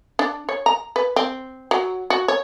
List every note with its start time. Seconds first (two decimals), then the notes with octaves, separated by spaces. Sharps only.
0.19 D4
0.49 C#5
0.66 A#5
0.96 B4
1.16 C4
1.71 F#3
2.10 F#4
2.28 C#5